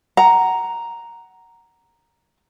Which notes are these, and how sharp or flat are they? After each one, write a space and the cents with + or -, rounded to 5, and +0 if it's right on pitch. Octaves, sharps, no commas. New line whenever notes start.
F#5 +15 A#5 +0